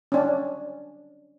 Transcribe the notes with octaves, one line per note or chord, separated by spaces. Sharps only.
C#4 D4